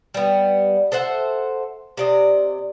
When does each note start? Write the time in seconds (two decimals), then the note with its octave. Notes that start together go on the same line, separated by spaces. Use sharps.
0.14 G3 B3
0.92 A4 C5 E5 F#5
1.97 C3 D5 D#5